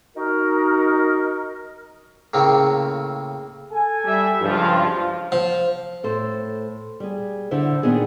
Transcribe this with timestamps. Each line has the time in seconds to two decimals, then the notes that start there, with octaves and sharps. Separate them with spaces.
0.16 D#4 F#4 A#4
2.34 A2 C#3 A#3 C4
3.71 A4 G#5
4.04 G3 E5
4.41 C#2 G2 F3 F4
5.32 F3
6.03 A2 A4 C5
7.00 G3 G#4
7.51 D3 E4 C5 E5
7.83 A#2 D#3 B3 D4 G#4